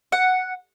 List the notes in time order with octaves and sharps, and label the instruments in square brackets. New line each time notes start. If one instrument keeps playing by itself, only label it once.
[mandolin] F#5